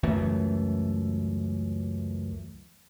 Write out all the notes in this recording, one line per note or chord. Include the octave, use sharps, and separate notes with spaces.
C#2 F#2 E3 A3